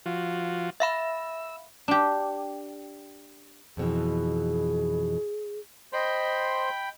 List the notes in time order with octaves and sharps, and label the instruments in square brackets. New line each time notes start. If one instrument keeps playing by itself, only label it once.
[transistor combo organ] F3 F4 F#4
[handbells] E5 F5 B5 [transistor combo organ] E6
[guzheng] D4 G4
[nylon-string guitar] F2 B2 E3 [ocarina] G#4
[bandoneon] C5 C6 [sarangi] D#5 [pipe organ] G5 B5